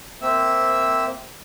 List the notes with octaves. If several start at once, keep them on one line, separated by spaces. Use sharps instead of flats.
A#3 C4 E5 E6